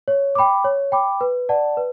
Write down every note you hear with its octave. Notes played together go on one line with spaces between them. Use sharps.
C#5
G5 B5 D6
C#5
G5 B5 D6
B4
D5 F#5 A5
B4